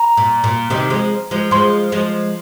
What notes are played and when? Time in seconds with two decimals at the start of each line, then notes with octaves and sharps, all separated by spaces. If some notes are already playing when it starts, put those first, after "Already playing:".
Already playing: A#5
0.17 A#2
0.44 A#2
0.70 C3 D#3
0.90 F3 G#3
1.31 F3 G#3
1.51 F3 G#3 C6
1.92 F3 G#3